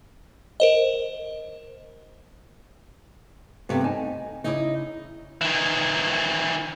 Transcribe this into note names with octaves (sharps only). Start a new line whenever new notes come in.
A#4 C5 D#5
G2 C3 A3 B3 G4
D#4 G#5 A5
C#3 D#4 E4 D5
D#3 E3